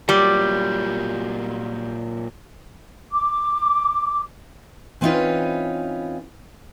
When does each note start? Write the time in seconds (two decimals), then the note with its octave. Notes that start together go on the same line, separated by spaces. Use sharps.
0.09 A#2 F#3 G3
3.12 D6
5.01 E3 C4 C#4 D#4 F4 B4